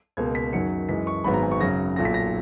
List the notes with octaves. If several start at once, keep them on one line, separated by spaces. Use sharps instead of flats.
C#2 B2 A#3 G#6
B6
F#2 D#3 F#3 C#7
F#2 E3 G#3 B6
C#6
G#1 G#2 F#3 B3 B5
A#5
G#5
C#6
F#2 C#3 F#3 A#6
B1 A#2 F#3 A#6
B6
A#6